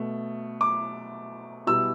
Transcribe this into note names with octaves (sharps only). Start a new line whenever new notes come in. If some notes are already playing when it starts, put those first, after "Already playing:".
Already playing: B2 A3
D6
B2 G3 E4 E6